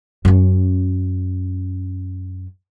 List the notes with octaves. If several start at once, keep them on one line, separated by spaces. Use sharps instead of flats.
F#2 C#4